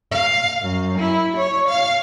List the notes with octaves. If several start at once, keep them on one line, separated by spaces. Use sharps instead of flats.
F5
F#2
E4
C#5
F5